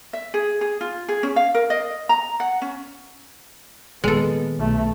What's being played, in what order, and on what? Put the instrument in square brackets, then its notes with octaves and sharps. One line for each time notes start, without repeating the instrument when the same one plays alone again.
[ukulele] E5
G#4
G#4
F4
G#4
C#4
F5
A#4
D#5
A#5
F#5
C#4
[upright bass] A#2 D#3 [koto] G#3 A4 [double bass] B3
[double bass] B1 A3